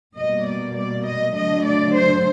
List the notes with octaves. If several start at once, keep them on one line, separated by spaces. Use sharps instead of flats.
B2 G3 A#3 D#5
D5
D5
D#5
D3 F#3 A3 D#5
D5
C5